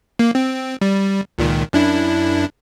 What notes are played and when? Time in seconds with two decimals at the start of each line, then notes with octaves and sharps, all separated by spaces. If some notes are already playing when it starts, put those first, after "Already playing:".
0.19 A#3
0.35 C4
0.81 G3
1.38 C#2 A#2 D#3
1.73 F#2 D4 E4